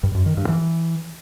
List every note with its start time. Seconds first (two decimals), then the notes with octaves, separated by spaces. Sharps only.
0.03 G2
0.15 F#2
0.26 D#3
0.37 G2
0.48 E3